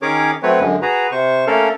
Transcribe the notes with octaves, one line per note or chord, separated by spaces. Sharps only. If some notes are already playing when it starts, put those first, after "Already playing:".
D#3 C#4 G#4 A#4 C#5 D6
F#3 A3 C4 B4 C#5
F#2 D3 G#3
F#4 G#4 B4 A#5
C3 C5 C#6
A3 A#3 C#4 A4 A#4 F5